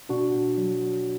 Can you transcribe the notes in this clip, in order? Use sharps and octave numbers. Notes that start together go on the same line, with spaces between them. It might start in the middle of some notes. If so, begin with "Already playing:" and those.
B2 D4 F#4
B2
F#3
F#3